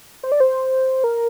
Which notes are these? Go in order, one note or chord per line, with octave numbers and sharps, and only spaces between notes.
C5
D5
C5
A#4